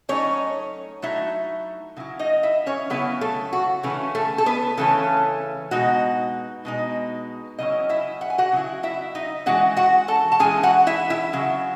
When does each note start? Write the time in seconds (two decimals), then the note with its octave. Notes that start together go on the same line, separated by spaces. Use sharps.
0.09 F#3 A3 C#4 D#4 C#5
1.02 F#3 A3 D#4 E4 E5
1.97 C#3 F#3 E4
2.19 D#4 D#5
2.43 E4 E5
2.66 C#4 C#5
2.90 C#3 F#3 B3 C#4 E4 B4
3.21 A3 A4
3.53 F#4
3.83 C#3 E3 A3 C#4
4.15 A3 A4
4.38 A4
4.46 B3 B4
4.77 C#3 E3 A3 C#4 A4
5.71 B2 G#3 D#4 F#4
6.65 B2 G#3 D#4
7.59 C#3 F#3 C#4 E4 D#5
7.89 E4 E5
8.21 F#5
8.30 G#5
8.38 F#4 F#5
8.52 C#3 F#3 E4
8.83 E4 E5
9.15 D#4 D#5
9.46 E3 G#3 C#4 F#4 F#5
9.77 F#4 F#5
10.08 A4 A5
10.32 A5
10.39 E3 G#3 C#4 G#4 G#5
10.63 F#4 F#5
10.87 E4 E5
11.10 E4 E5
11.33 C#3 F#3